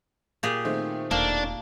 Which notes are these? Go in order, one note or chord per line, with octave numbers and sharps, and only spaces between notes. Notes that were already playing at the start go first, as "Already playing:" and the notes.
A#2 G4 G#4
D#3 A3 C4
E1 A#3 D4